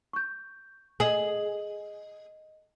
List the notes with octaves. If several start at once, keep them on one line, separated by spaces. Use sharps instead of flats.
C#6 G6
G#4 D#5 F#7